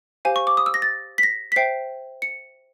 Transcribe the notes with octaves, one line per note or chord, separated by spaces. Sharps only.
G4 C5 F5 G#5
C#6
D6
D#6
E6
A#6
A6
B6
A#6
B6
C5 E5 G5 C7
C#7